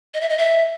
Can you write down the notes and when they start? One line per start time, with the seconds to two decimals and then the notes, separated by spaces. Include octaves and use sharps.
0.14 D#5
0.21 E5
0.29 D#5
0.38 E5